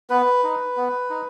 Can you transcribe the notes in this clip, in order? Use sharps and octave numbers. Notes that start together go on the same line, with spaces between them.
B3 B4
D#4
B3
D#4